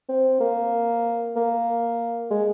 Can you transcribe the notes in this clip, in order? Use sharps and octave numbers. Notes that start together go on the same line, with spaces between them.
C4
A#3
A#3
G#3